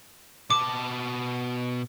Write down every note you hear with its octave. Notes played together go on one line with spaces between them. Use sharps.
B2 A5 D6